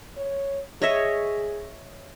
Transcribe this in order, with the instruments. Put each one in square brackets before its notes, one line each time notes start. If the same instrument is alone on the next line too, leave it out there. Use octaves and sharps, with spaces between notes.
[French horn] C#5
[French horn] G#4 [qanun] C#5 D#5 E5